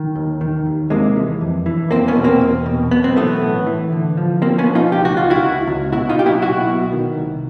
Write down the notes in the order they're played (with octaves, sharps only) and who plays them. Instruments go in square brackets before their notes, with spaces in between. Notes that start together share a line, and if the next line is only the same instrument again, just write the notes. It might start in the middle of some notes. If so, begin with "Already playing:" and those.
Already playing: [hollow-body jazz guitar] D#3
D#2
D#3
D#2
C3 G#3 A#3
E3
F2
E3
E2 A#3 C4
B3 C#4
B2
A#3 C4
E2
B2
B1 B3
C4
E3 A3 B3
A2
E3
D3
F3
F3 A#3 C4
B3 C#4
F3
D#4 F4
C#2 G4
F#4
C#2 F4
E4 F#4
C#2
C#2
B2 E4 F#4
D#4 F4
B1 G4
E4 F#4
B1 E4 F#4
B2
D#3
C2